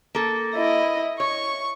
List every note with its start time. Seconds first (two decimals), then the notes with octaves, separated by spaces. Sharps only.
0.15 A#3 A4
0.55 E4 D#5
1.20 C#5 C#6